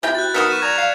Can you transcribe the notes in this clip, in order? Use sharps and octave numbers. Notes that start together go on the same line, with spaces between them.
C3 E4 F4 G4 G5
F#4 F#6 G6 A6
F#3 B3 D#4 A#4 B6 C#7 E7
C#6 D#7 E7
D5 A#5 G#6 F7
F5